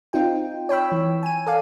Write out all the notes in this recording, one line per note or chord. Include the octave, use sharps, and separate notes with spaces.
C4 D#4 F4 G5
C#5 G5 B5 E6
E3
G#5 D#7
A4 D5 F5